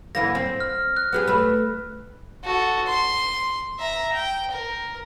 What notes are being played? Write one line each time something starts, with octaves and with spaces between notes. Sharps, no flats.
D3 E3 A#3 A#6
C4
F6
F#6
B3 G4 G#4
A3 B4
F#4 A4
C6
E5 A#5
G5
A#4